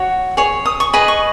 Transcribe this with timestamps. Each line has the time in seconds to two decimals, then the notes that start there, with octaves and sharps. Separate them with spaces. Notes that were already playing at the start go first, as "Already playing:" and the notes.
Already playing: F#4 C#5
0.37 G#4 C#5
0.66 D#6
0.80 C#6
0.93 G#4 B4 D#5 B5
1.08 C#6